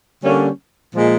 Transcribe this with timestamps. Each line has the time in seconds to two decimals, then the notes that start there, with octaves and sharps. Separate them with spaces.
0.23 D3 G3 A#3 C#4
0.95 A#2 F3 G#3